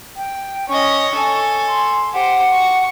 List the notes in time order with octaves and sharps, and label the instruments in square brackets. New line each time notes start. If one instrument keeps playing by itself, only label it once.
[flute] G5
[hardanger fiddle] C#4 D#5 [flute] C#6
[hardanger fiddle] A4 G#5
[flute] C6
[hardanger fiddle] G4 C5 [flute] F#5
[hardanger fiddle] C#6